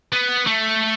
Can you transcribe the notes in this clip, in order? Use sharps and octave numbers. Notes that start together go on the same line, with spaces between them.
B3
A3